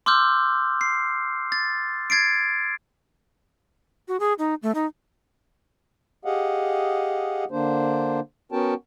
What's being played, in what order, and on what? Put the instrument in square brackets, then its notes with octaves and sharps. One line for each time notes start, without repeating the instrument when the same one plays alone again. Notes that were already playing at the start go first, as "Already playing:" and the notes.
[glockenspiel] C6 D6 E6 F6 G6
C7
A6
G#6 A6 C7 D7
[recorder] F#4
G#4
D#4
A3
D#4
[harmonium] G4 G#4 D#5 F5 F#5
D3 A#3 D4 C5
B3 C#4 F#4 A#4 G5 A5